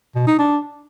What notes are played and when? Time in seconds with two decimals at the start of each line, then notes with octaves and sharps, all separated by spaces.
0.15 B2
0.27 D#4
0.39 D4